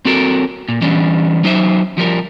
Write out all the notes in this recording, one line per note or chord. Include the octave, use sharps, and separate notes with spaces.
C4 F#4 A4 A#4
A#2
E3 G3 C#4 D4
F#3 D#4 C5 E5
F3 G3 A#4